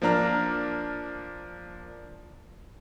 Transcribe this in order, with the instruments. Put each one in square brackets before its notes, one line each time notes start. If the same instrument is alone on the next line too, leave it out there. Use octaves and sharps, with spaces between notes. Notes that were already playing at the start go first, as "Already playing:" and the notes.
[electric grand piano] F3 A#3 D4 A#5 F6